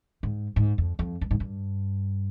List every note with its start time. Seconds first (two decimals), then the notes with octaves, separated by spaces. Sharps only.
0.23 G#2
0.56 G#2
0.78 F2
0.99 F2
1.21 G2
1.31 G#2
1.40 G2